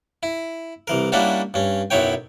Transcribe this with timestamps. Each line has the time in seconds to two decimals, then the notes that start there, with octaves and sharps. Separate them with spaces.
0.23 E4
0.87 C2 E3 A#4
1.12 G3 A#3 C#4 D4 E4 F#4
1.54 G2 C#4
1.90 B1 F#2 F#3 E4 C#5 G5